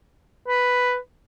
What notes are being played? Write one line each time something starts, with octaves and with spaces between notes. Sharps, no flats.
B4